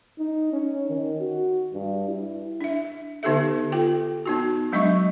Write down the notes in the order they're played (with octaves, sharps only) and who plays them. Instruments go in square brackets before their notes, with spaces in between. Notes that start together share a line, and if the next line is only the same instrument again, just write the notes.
[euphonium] D#4
C#4
D#3
F#4
G2
E4
[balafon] D4 E5
D3 B3 D#4 G4 A4 E5
F4 A4 G5
B3 D#4 F#4
F#3 G#3 D4 D#5 E5 C#6